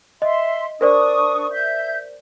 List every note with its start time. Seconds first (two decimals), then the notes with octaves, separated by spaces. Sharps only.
0.22 D#5 E5 C6
0.81 D4 A#4 C5 D5 C#6 D#6
1.52 E5 G6